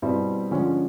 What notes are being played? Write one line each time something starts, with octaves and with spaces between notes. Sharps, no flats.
B2 G3 C4 E4
D3 F3 G#3 C#4